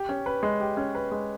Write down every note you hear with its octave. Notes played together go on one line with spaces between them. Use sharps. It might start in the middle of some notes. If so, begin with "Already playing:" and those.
Already playing: G4
C#4
B4
G#3
G4
C#4
B4
G#3